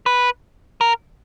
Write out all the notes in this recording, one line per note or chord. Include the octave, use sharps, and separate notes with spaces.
B4
A#4